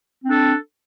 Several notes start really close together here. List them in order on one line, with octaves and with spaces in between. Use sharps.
C4 D4 A4